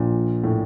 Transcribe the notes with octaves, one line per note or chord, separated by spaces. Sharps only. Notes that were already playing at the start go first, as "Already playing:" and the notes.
Already playing: A#1 A#2
A2